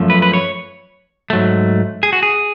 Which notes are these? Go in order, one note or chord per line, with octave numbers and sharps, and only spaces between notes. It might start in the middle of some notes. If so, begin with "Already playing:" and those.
Already playing: F#2 F3 A3
B4
B4
C#5
G#2 F#3 A3
G#4
F#4
G#4